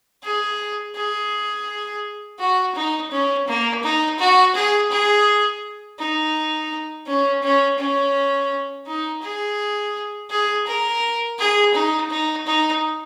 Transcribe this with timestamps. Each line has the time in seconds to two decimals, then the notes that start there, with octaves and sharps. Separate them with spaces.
0.23 G#4
0.96 G#4
2.39 F#4
2.75 D#4
3.11 C#4
3.48 A#3
3.83 D#4
4.19 F#4
4.55 G#4
4.91 G#4
5.99 D#4
7.07 C#4
7.43 C#4
7.79 C#4
8.87 D#4
9.23 G#4
10.30 G#4
10.67 A#4
11.39 G#4
11.75 D#4
12.11 D#4
12.47 D#4